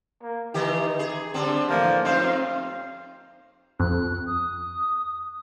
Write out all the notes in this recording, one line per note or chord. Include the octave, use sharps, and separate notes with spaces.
A#3
D#3 E3 D#4 G4
G#4
D3 G3 C4 D4
A2 E3 F3 A#3
F2 C4 D#4 C5 F5
F2 F#6
D#6